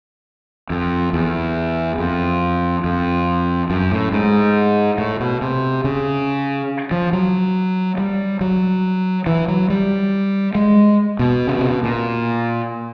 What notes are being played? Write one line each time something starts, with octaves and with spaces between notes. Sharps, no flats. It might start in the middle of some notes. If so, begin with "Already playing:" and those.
F2
E2
F2
F2
F#2
A2
G#2
A2
B2
C3
C#3
F3
F#3
G3
F#3
E3
F#3
G3
G#3
B2
C#3
C3
B2
A#2